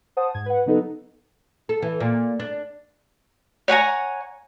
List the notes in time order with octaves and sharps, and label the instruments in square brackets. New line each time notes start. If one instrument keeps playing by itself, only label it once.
[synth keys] C5 F#5 A5 D#6
G#2 G#6
B4 F#5
C#3 F#3 B3 D#4 A4 B4
[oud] A4
E3
A#2
D4
[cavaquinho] C#5 F#5 G#5 A#5